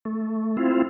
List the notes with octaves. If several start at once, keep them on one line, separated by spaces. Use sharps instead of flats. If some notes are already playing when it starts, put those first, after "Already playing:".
A3
C4 E4 F4